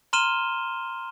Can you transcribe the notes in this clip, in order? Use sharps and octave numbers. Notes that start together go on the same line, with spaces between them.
A#5 C6 F6 D#7 E7 G7